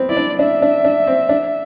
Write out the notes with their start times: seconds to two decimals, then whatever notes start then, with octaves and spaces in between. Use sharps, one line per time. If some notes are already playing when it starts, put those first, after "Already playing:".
Already playing: B3 C4
0.09 E4 D5
0.17 D4
0.39 D4 E5
0.62 D4
0.84 D4
1.07 C4
1.29 D4